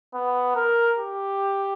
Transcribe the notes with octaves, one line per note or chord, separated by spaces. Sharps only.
B3
A#4
G4